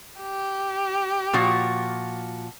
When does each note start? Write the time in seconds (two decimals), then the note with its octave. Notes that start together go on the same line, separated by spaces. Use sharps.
0.21 G4
1.33 A#2 F3 F#4